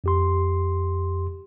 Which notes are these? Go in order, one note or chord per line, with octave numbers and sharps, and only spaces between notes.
F2 G4 C6